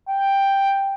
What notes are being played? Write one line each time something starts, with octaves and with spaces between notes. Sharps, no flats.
G5